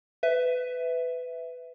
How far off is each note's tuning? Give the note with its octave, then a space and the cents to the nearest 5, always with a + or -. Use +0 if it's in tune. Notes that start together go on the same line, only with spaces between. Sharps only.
B4 +20 E5 +0